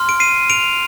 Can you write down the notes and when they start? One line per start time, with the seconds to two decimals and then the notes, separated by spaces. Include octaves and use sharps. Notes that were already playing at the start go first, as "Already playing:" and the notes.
Already playing: C6 F6
0.09 D7
0.20 C7 D#7
0.50 D7 F7